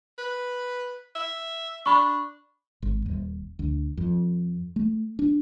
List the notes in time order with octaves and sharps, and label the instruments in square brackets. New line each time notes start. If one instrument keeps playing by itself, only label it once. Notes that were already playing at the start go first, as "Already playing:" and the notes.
[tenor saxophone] B4
E5
[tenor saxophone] D4 [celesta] B5 C#6
[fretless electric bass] G#1
D#1
D2
F2
A3
D4